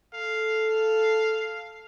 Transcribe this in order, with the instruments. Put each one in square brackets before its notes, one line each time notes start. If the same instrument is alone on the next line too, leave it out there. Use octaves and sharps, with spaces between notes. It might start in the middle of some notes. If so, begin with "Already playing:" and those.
[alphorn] A4 [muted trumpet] F5